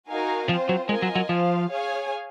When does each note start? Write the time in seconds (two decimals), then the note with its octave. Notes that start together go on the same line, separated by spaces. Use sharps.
0.08 D#4 F#4 A#4 F5 G#5
0.49 F3 C4 F4 C5
0.69 F#3
0.89 G#3 F4 A#4 D#5 G#5
1.02 F#3
1.15 F#3
1.29 F3 F4 C5 F5
1.70 G#4 C#5 F5 G#5